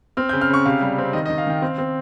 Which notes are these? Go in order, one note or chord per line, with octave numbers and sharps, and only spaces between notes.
C4 F6
G6
C#3
F6
C#3 C#6
C3 F5
G3
C4
D#3 D#5
D#5
D#3
F5
D#3 G5
C4 F5
C4